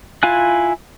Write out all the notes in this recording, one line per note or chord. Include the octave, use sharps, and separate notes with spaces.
E4 F4 F5 G#5 F#6